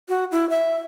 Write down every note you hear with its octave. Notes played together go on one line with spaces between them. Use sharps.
F#4
E4
E5